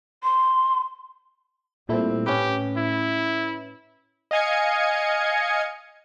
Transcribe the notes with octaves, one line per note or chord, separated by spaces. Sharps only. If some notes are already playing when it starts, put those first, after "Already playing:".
C6
A#2 G3 A3 C4 E4
A2 C#4 G4 B4
E4
D#5 F5 G#5 G#6 C#7